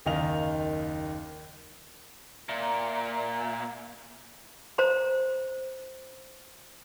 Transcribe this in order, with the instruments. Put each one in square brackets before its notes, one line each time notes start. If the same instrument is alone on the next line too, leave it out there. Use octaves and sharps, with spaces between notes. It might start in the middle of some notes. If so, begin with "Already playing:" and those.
[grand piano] F#1 D#2 D#3 D#5 F5 F7
[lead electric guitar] A#2 [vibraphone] E5 A#5
[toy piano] C5 A#5 C6